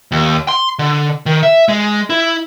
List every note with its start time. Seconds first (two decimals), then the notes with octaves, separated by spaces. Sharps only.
0.12 D#2
0.48 C6
0.79 D3
1.26 D#3
1.43 E5
1.69 G#3
2.10 E4